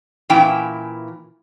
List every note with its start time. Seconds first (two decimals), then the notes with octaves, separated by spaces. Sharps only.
0.30 A#2 E3 C#4 E4 G5